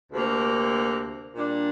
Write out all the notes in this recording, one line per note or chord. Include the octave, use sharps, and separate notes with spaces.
D2 C3 A#3
A#2 G3 D4